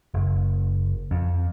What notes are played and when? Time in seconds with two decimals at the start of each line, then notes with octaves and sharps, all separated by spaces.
0.14 F#1
1.11 F2